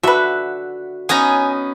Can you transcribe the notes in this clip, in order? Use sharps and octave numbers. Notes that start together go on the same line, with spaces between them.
D3 F#4 B4 E5
B3 C#4 D#4 G#5 A#5